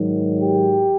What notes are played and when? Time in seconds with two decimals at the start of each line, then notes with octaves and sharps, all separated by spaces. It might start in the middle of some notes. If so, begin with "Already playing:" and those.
Already playing: G#2 D#3 F#3
0.40 G4